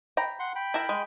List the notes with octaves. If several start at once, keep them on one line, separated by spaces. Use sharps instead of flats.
G5 A#5 B5
F#5 C6
G5 B5
E4 A#4 E5
G#3